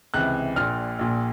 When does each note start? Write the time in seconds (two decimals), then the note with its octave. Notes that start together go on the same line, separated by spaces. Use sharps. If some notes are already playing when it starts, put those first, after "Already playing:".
0.14 C#2 C3 E3 F#6
0.56 A#1 A#2 F6
0.99 A#1 A#2